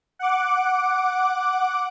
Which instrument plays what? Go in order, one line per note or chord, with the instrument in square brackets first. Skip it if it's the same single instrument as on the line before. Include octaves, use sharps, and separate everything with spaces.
[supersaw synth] F#5 D6